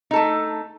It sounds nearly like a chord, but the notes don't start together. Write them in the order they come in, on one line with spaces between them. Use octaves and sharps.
D#4 A4 A3